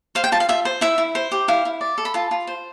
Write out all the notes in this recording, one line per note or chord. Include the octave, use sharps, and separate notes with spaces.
C5 F5
G5
F4 A5
F5
F4 E5
C5
E4 E5
E4
C5
G4
E4 F5
E4
D5
A4
B5
F4 A5
F4
C5